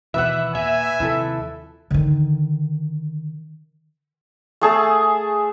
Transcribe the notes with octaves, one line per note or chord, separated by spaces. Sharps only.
D#2 B2 E3 B4 D5 E5 F#5
A#2 E5 G#5
D#2 C3 F3 E4 A4
D3 D#3
A3 G#4 A5